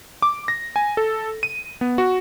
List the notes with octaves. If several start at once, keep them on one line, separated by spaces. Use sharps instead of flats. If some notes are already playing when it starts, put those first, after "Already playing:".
D6
A#6
G#5
A4
D#7
B3
F#4